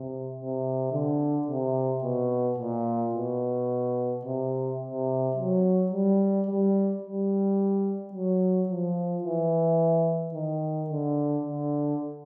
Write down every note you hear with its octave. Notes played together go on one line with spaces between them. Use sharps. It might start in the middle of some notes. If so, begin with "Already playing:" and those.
Already playing: C3
C3
D3
C3
B2
A#2
B2
C3
C3
F#3
G3
G3
G3
F#3
F3
E3
D#3
D3
D3